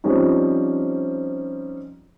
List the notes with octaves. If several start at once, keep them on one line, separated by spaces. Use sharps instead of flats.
F3 G3 C4 C#4 D#4